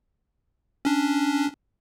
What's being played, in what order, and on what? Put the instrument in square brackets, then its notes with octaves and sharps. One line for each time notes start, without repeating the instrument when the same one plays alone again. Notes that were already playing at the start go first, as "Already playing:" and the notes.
[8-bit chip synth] C#4 D4